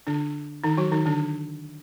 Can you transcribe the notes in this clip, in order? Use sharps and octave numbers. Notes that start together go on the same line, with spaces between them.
D3 D4
D#3 D#4
F#3 F#4
D#3 D#4
D3 D4